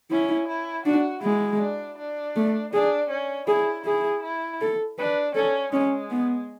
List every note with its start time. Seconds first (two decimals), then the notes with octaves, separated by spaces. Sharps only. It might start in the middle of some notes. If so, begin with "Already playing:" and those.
0.11 C#4 E4
0.48 E4
0.85 D4 F#4
1.23 G#3 E4
1.60 D4
1.98 D4
2.36 A3
2.73 D4 G#4
3.10 C#4
3.48 E4 G#4
3.85 E4 G#4
4.23 E4
4.61 A4
4.98 D4 B4
5.35 C#4 A4
5.72 G#3 C#4
6.11 B3